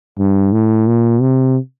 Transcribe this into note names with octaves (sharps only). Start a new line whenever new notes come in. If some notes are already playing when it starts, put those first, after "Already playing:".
G2
A2
A#2
C3